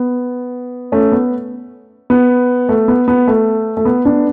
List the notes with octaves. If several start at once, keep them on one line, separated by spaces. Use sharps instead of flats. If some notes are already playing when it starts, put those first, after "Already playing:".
Already playing: B3
A3 C#4
B3
B3
A3
B3
B3
A3
A3
B3
B3 D4